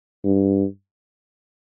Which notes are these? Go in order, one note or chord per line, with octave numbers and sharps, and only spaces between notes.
G2